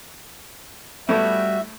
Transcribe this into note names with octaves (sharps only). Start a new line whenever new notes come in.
A2 G3 A3 B3 F#4 E5